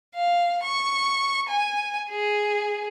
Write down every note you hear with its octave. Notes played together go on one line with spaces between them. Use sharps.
F5
C#6
G#5
G#4